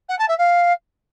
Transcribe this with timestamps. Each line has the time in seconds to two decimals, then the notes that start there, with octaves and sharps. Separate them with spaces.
0.09 F#5
0.19 A5
0.29 E5
0.38 F5